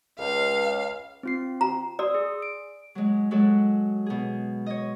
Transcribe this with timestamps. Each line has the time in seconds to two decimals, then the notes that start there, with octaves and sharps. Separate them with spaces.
0.19 C#2 F5
1.23 C4 F4 C7
1.61 A#5
1.99 D5 C6 D#6 E6
2.15 G#4
2.42 D7
2.95 F#3 G#3
3.31 F#3 G#3 F#4 A4
4.06 B2 G#4
4.66 C#5 D#5